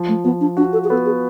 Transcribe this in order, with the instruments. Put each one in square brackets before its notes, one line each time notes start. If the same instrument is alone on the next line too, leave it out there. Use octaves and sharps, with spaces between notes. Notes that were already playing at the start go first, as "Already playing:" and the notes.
Already playing: [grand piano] F3
[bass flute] A3
[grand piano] F3 [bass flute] B3
[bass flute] D4
[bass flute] D4 [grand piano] F#4
[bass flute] A4
G#4
[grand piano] B3 [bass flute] A4
[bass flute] G#4